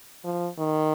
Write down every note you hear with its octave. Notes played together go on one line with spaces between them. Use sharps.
F3
D#3